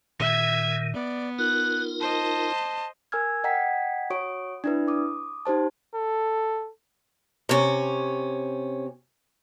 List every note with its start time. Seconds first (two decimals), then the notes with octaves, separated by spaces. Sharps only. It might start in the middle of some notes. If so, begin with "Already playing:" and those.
0.20 A#2 D#3 E5 G#6
0.94 B3 D5
1.39 D#4 F4 A#4 F#6
2.01 C5 D#5 A5
3.12 A#4 G#5 E6 F6 G#6
3.44 D#5 F#5 G5 A#5 G#6 B6
4.10 F#4 C#5 C#6 D#6 D7
4.64 D4 E4 B4
4.88 D6 D#6
5.45 D#4 G4 C5 A5
5.95 A4
7.49 C3 C#4